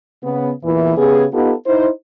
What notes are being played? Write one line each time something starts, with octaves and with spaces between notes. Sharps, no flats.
C#3 B3
E2 A#2 E3
C#3 B3 G4 G#4
B3 D#4 F4 G4 A4
D#4 E4 C5